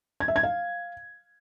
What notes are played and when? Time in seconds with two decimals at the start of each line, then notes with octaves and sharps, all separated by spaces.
0.20 G#6
0.28 E5
0.36 G#6
0.43 F5